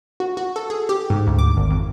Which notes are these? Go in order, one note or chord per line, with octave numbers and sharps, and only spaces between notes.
F#4
F#4
A4
G#4
G4
G#2
D2
D6
G#1
F2